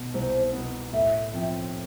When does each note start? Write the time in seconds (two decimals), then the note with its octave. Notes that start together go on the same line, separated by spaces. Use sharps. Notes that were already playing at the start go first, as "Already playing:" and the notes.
Already playing: B2 B3
0.14 C2 C5
0.53 B2 B3
0.93 A2 E5
1.33 F3 C4